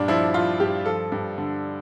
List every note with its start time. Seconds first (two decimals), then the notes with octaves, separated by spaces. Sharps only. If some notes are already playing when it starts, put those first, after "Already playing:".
Already playing: G2 A#2 D4
0.08 F3 E4
0.34 F3 F4
0.60 G2 G4
0.86 F3 A4
1.12 G2
1.38 D3